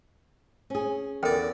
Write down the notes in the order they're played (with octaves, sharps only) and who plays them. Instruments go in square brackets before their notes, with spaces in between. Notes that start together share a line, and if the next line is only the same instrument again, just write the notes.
[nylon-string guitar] C#4 G#4
[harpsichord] E2 D5 [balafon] A4 [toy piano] A#4 G5